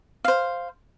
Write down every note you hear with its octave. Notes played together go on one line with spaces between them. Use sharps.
C5 F5